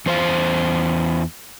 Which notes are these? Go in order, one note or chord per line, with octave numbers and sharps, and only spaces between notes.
E2 C5 F5